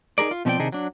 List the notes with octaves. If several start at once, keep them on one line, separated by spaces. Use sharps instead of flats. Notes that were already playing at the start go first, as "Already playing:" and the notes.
D#4 E4 G#4 A#4 D5
F4
B2 F3 C4 F#4 D5 G5
C3 D#3 D4 D#4 G#4
F#3 D4